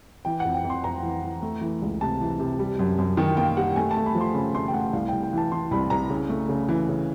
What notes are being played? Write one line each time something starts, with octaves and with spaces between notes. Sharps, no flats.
E3 G5
F2 F#5
G5
F2
C6
F2 A#5
E3
E3
A3
E3
C#2
C3 A5
E3
C3
G3
F#2
F#2
D#3 G5
A#3 G5
G3 F#5
A3 G#5
A5
A3
B5
F3
C6
C#3 B5
A3 C6
G5
A3 F#5
C2 F5
C2 G5
G5
E3 A5
E3 C6
C2 B5
C2 A#5
C#3
A3
C#3
E3
C#3